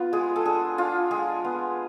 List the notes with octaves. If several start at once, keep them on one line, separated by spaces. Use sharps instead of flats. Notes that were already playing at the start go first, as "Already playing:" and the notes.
Already playing: B3 F4
G#3 G#4
A4
D4 G#4
D4 F4
G#3 G#4
B3